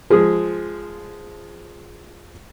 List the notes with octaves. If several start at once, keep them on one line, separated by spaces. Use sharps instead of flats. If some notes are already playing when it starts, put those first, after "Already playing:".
F3 G#3 G#4